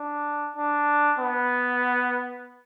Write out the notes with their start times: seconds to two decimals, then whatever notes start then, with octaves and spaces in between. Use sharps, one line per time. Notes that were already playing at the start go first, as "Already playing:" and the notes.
Already playing: D4
0.57 D4
1.19 B3